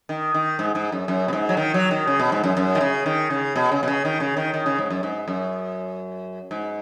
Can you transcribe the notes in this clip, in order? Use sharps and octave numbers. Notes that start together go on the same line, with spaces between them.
D#3
D#3
G#2
G#2
F#2
F#2
B2
G#2
F#3
D#3
F#3
D#3
C#3
B2
G#2
F#2
F#2
D#3
C#3
D#3
C#3
B2
C#3
B2
C#3
D#3
C#3
D#3
D#3
C#3
G#2
F#2
G#2
F#2
G#2